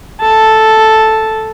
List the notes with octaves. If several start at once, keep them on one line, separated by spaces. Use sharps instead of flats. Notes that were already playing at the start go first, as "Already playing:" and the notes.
A4 A5